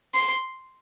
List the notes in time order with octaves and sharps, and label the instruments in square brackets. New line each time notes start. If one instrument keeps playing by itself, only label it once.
[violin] C6